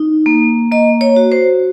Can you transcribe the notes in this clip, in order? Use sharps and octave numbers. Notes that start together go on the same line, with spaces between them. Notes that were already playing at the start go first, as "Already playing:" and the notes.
Already playing: D#4
A#3
A#3 D#5
C#5
F#4
C5